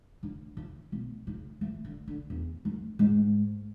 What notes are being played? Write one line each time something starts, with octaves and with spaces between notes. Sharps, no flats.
D3
C#3
B2
C#3
E3
D3
D3
E2
F#2
G#2